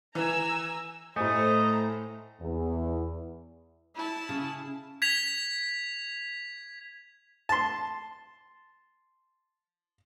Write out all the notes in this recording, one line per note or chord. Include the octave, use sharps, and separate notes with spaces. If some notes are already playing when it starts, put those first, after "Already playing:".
E3 G#5 A#5 E6
A2 A3 C5 D#5 G#5 A#5
E2
E4 A5
C#3 G#4
G#6 B6 F7
A5 C6